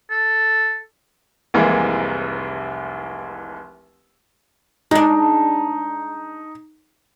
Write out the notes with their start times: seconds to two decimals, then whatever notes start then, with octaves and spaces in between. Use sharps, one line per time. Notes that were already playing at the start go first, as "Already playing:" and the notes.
0.10 A4
1.54 F1 C2 C3 E3 G#3 A#3
4.91 G#3 D4 D#4